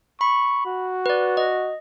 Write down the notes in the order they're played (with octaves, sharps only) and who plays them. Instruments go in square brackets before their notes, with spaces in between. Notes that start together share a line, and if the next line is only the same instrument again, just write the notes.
[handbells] B5 [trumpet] C#6
[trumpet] F#4
[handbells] B4 D5
D#5